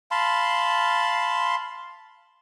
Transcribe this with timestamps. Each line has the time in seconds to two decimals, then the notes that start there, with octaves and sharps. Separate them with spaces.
0.11 F5 A5 B5 C6